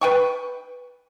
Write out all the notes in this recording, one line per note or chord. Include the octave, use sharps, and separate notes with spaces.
B4 G5 C#6